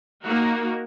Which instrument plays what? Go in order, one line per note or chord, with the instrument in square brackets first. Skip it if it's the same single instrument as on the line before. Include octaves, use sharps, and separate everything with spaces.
[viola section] A#3 D#4 F#4 A#4